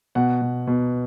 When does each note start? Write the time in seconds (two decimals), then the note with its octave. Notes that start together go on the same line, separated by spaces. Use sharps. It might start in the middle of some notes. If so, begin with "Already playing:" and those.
0.15 B2 F#5
0.42 B2
0.67 B2